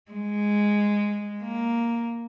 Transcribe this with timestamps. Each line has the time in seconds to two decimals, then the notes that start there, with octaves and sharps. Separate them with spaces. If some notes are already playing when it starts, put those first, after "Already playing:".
0.11 G#3
1.43 A#3